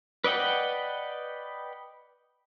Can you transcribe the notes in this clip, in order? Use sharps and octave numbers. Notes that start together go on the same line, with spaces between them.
B4 D5 D#5 F#5 G5